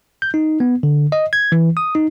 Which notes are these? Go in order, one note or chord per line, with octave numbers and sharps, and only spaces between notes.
G6
D#4
B3
D3
D#5
G#6
E3
D#6
D#4